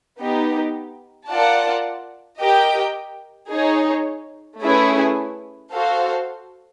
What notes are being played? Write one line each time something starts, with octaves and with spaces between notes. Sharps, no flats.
B3 D#4 G4
F4 A#4 D5 F#5 A5
G4 A#4 D#5 G5
D#4 G#4 C#5
A3 C#4 E4 G#4 B4
F#4 A4 C5 F5